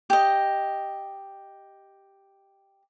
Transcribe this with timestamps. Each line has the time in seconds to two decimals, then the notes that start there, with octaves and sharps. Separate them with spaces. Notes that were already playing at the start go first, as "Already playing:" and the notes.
0.10 G4 D#5